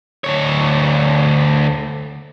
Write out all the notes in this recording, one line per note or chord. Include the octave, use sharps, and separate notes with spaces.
D2 C#5